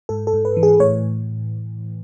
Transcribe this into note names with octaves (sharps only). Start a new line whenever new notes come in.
G#2 A4
A4
G#2
B4
E3
G#4
A2 C#5